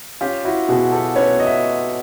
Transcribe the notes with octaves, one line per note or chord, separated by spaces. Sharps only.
C#4 F4 G4
E4 F#4
B2 F#4 G#4
G4 A4
C#4 B4 C#5
D#5
E5